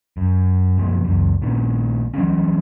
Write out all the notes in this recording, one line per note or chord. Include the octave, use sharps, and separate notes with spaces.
F#2
F#2 B2 F3 A#3
C#2 F#2
A#1 A#2 D#3
E3 F#3 G3 C#4